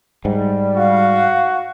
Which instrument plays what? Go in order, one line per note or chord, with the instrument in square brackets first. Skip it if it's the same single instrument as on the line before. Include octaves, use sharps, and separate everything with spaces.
[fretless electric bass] G#2 [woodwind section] G3
[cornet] F#4 [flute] F5